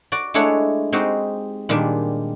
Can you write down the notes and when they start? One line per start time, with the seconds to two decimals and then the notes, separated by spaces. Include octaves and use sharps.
0.12 F#4 D5
0.34 G#3 A3 D4 E4 C#5 F#5
0.92 G#3 C4 D#4 F#4 G4
1.69 A#2 D#3 G3 G#3 D4